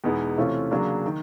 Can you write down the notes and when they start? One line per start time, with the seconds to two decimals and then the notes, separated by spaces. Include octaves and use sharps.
0.04 E2 B2 G#3 B3 D#4
0.37 C3 E3 A3 C#4 F4
0.71 C#3 F#3 A#3 D4
1.06 D#3